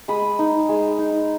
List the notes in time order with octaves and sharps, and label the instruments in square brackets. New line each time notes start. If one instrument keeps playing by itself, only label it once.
[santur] G#3 B5 D#6
D#4
G#3
D#4